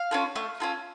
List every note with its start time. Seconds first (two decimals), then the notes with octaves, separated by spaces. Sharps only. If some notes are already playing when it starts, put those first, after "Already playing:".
Already playing: F5
0.11 C#4 F4 A4
0.36 A3
0.60 C#4 F4 A4